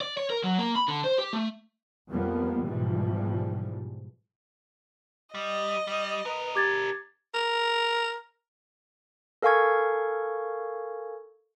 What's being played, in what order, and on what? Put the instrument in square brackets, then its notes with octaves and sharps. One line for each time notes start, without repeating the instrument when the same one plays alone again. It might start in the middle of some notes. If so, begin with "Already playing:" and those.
[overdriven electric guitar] D5
C#5
A#4
F#3
A#3
B5
D3
C5
G4
A3
[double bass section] F2 F3 G3 A#3 B3
G#2 B2 E3 F3 G3
[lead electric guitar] G3 [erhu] D#5
[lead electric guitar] G3
[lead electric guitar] D4 A#4 [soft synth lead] B4
[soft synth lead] G4 [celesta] D6 G#6 A6
[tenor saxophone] A#4
[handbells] A4 A#4 F5 G#5 C#6 G#6